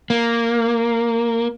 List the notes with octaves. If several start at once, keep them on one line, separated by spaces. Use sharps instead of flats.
A#3